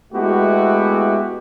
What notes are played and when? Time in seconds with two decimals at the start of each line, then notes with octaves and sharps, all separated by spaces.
0.13 G#3 A3 B3 E4 F#4 G4